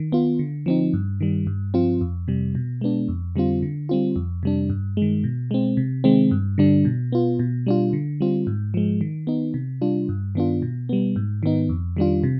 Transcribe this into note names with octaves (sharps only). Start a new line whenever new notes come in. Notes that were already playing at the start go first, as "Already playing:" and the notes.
Already playing: D#3
B3 F4
D3
F3 C4 D#4
G2
D#3 G3
G2
F3 C4 F4
F2
C3 G3
B2
G#3 B3 D4
F2
D3 G3 C4 F4
D3
G3 C4 F4
F2
C3 G3 D4
G2
D#3 G#3
B2
G#3 C4
C3
D#3 G#3 C4
G2
D3 G3 D4
B2
B3 F4
B2
G3 D4 F4
D3
G3 C4 F4
G#2
F3 G#3
D#3
B3 D#4
C3
G3 D4 F4
G2
D#3 B3 D4 F4
B2
G3 B3
G#2
D#3 B3 D#4
F2
D#3 G3 D4 F4
C3